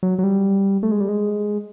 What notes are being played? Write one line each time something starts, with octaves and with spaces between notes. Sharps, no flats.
F#3
F#3
G3
A3
G#3
G3
G#3